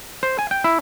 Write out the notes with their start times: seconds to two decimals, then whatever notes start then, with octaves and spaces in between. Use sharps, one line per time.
0.23 C5
0.39 G#5
0.51 G5
0.64 E4